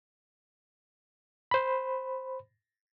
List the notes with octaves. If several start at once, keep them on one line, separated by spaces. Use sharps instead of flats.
C5 B5